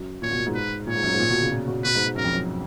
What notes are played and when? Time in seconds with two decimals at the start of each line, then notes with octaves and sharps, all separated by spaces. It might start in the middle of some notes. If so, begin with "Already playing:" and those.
Already playing: F#2
0.22 A#2 C#5
0.31 B2
0.39 A#2
0.46 G#2
0.55 B4
0.87 A#2 C#5
0.95 G#2
1.03 F#2
1.12 G#2
1.19 A#2
1.30 B2
1.41 C#3
1.52 A#2
1.68 B2
1.84 B2 B4
1.95 G#2
2.06 G#2
2.15 F#2 A#4
2.24 F2
2.33 F#2